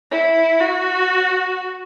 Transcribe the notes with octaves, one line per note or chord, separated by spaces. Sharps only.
E4
F#4